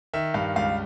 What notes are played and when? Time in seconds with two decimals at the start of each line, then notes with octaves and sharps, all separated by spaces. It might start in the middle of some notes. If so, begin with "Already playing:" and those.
0.14 D#3 E5
0.34 G2 F5
0.56 C#2 F5